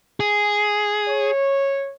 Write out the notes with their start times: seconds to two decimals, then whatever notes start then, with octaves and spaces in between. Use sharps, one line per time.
0.20 G#4
1.08 C#5